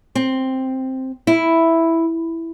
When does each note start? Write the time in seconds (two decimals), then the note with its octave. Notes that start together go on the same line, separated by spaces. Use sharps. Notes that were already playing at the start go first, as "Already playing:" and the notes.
0.15 C4
1.27 E4